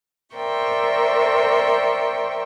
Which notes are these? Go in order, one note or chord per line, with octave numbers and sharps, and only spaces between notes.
A#4 C5 D5 E5 G5 C#6